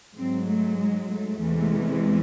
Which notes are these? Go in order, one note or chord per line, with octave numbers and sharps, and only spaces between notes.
G#2 F#3 C4
A3
G#3
A3
E2 C3 E3 G#3